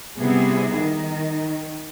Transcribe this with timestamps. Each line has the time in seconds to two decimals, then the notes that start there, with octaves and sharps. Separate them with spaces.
0.18 C3 G3 B3 E4 G#4
0.75 D#3